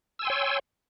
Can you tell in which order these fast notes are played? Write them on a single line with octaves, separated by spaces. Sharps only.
E6 G#5 C6 G5 C#5